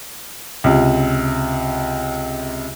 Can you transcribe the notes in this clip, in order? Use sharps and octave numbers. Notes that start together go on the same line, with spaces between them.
C#2 C3